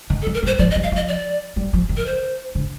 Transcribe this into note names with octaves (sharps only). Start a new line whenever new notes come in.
D#3
A4
F3
A#4
G3
C5
F3 D5
D#5
G3
F5
F3 D#5
D5
G3
F3
D#3
A#4
C5
D3